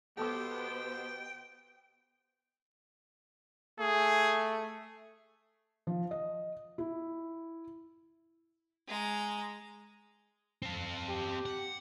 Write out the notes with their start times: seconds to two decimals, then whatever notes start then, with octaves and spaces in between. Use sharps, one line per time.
0.18 B2 B3 G4 A4 C5 G5 D6
3.80 A3 G#4
5.87 F3
6.11 D#5
6.78 E4
8.88 G#3 A#5
10.62 C4 A4
11.09 G4
11.46 F#5